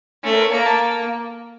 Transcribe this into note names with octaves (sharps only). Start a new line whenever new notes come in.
A3 C#4
A#4
C#5
A#3 A#5
A5